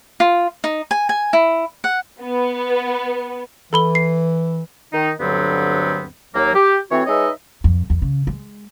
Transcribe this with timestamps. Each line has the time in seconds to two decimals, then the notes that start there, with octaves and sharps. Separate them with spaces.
0.20 F4
0.64 D#4
0.91 G#5
1.09 G#5
1.33 E4
1.84 F#5
2.21 B3
3.73 E3 A4 B5 G7
3.95 C7
4.93 D#3 D#4
5.20 D2 G2 D3 F#3 B3 C4
6.34 D#2 F#3 A#3
6.54 G4
6.91 E3 A3 C4 F#4 C#5
7.06 G#3 D#4 B4 C#5 D#5 E5
7.64 F2
7.90 E2
8.02 C#3
8.27 G#3